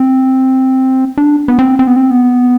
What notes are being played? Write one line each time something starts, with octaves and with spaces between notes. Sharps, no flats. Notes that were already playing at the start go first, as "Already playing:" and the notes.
Already playing: C4
D4
B3
C4
C4
B3
C4
B3